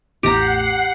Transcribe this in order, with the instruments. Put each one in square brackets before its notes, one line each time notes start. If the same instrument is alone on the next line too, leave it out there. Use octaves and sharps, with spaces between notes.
[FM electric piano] A1 E2 A2 [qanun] G4 A#5 [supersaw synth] F#5 C7